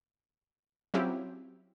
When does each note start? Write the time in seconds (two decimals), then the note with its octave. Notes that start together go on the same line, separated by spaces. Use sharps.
0.94 F#3 C4 C#4 E4 F4 G4